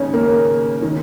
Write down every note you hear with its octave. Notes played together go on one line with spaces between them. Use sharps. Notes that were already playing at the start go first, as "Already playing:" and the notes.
Already playing: D#2 C#3 C#4 D#4
A#3
D#3